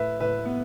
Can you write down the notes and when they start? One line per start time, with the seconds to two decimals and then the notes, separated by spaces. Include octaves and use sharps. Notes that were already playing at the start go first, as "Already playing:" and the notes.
Already playing: A2 B4 E5
0.20 A2 B4 E5
0.45 B3